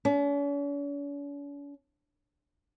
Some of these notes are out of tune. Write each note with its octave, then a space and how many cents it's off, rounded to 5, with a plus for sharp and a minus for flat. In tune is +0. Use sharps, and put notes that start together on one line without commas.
C#4 +45